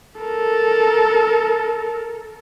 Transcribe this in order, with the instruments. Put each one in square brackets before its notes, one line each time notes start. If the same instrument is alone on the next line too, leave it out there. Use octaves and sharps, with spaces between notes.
[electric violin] A4 A#4